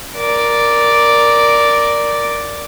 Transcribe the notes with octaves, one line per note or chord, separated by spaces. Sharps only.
A#4 D5